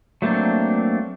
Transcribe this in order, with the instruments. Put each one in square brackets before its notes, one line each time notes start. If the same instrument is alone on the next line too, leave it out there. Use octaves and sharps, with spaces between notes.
[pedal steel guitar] F#3 A3 A#3 C4 D4